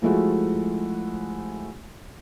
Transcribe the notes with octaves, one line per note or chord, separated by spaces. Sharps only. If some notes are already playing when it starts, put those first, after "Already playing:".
F3 G#3 A3 E4 F#4